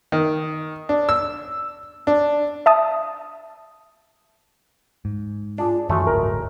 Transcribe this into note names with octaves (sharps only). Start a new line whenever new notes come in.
D#3
D4
E6
D4
E5 A5 D#6
G#2
D4 F4 G#4
F#2 D#3 E3 G#3 A3 C#4 F#4
D1 G1 A#4